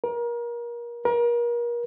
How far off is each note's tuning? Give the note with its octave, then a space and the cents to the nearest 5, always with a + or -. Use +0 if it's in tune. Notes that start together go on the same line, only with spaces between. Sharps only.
A#4 +30
A#4 +35